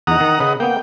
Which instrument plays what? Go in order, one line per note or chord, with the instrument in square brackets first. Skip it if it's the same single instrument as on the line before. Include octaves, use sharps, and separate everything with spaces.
[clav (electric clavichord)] E2 D#4 [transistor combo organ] F#5 A#5 D#6
[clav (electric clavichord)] D#3
[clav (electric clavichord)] C#3 [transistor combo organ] B4 D#5 F#5
[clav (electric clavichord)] A#3 B3 [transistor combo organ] G5